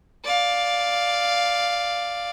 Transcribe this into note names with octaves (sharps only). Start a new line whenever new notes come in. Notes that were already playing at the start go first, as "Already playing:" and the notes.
D5 F5